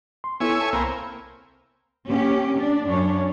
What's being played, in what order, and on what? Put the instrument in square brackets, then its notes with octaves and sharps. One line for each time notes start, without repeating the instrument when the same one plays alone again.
[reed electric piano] C6
[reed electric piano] B3 E4 A4 [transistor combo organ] C#5 E5 G#5
[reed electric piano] A5
[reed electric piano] C2 B5 [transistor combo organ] A#3 C4
[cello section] A#3 C#4 G4
D4
F#2 C#4 D4 C#5